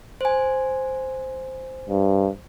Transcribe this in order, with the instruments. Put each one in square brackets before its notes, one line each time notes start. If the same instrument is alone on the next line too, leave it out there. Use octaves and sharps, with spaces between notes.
[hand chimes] C5 G#5
[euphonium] G2